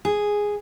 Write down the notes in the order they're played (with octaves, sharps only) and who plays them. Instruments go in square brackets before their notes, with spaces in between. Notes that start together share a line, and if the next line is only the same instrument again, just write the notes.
[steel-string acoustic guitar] G#4